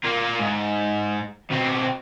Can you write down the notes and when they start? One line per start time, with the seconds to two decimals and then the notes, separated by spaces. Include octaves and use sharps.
0.04 A#3 F4
0.40 G#2
1.51 B2 C4